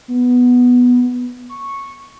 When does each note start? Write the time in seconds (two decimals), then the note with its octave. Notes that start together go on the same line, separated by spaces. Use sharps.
0.08 B3
1.49 C#6